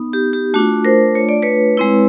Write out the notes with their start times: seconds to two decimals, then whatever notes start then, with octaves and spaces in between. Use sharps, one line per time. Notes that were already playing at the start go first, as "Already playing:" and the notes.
Already playing: B3 D#4
0.13 G4
0.33 G4
0.54 A3 D4 F4 F#4
0.85 A#4 C5
1.15 C#5
1.29 D5
1.42 B4 C#5
1.77 G#3 C4 E4